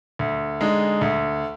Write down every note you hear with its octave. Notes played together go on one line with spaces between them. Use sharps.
D2
D3 G#3 D#4
D2